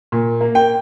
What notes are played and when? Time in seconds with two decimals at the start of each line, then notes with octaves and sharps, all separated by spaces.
0.12 A#2
0.41 A#3
0.55 G5